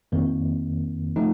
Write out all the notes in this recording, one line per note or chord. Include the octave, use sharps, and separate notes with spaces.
F2 D#3 A#3
F3 A3 D#4